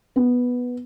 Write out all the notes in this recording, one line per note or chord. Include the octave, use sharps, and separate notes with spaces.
B3